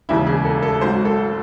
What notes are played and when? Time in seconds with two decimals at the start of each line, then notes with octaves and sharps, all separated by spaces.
0.09 E1 D#2 C#3 E3 E4
0.27 G#4
0.45 A4
0.63 A4
0.81 G#1 G#2 F#3 C5
1.05 A4